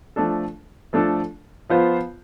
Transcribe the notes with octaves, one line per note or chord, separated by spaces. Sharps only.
F3 A3 D4 A4
F3 A3 D4 A4
F3 B3 F4 C5